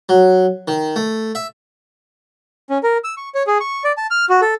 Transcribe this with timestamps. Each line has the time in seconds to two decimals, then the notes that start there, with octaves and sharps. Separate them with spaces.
0.09 F#3
0.68 D#3
0.96 A3
1.35 E5
2.69 C#4
2.83 A#4
3.04 E6
3.17 C#6
3.35 C#5
3.47 G#4
3.60 C#6
3.84 D5
3.97 A5
4.11 F6
4.29 F#4
4.42 A4